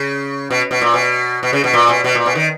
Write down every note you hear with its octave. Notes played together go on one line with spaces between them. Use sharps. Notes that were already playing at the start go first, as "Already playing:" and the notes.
Already playing: C#3
B2
B2
A#2
B2
B2
C#3
B2
A#2
B2
B2
A#2
B2
D#3